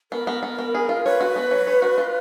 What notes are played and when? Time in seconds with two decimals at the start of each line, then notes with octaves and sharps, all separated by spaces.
0.12 B3 A#4
0.27 B3
0.43 B3
0.59 B3
0.75 G#4
0.89 F4
1.05 B4 C#5
1.21 F#4
1.36 B3
1.51 F#3
1.67 C#5
1.82 F#4
1.98 F4